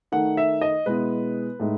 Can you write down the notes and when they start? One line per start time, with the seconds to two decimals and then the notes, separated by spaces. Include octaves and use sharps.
0.12 D#3 A3 D#4 F#5
0.37 E5
0.61 D#5
0.86 B2 G#3 B3 E4 B4
1.60 A2 G#3 D#4